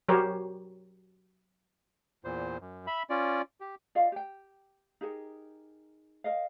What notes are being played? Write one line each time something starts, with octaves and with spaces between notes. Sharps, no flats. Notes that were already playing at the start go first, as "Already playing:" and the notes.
F#3 G4 A#4 C5 C#5
E2 A#2 C5
F#2
E5 B5
C#4 F4 D5
G4
F4 D5 D#5 F5
G4 G5
D#4 G4 G#4 A#4
A#4 D#5 F5